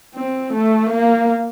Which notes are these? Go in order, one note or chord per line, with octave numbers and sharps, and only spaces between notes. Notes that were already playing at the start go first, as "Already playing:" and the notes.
C4
A3
A#3